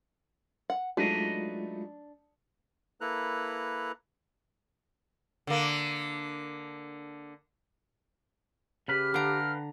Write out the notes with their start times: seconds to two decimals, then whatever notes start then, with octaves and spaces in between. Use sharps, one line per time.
0.70 F#5
0.97 F#3 G#3 A3 D4 D#4 F4 B4 D#5
3.01 A#3 E4 A4 B4 A#5 F#6
5.47 D3 A#3
8.88 C#3 G4 B4 B5 F6
9.14 D3 B4 F5 G5 A#5